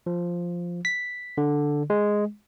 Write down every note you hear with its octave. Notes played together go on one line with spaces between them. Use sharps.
F3
B6
D3
G#3